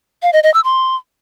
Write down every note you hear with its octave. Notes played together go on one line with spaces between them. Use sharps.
F5
D#5
D#5
E6
C6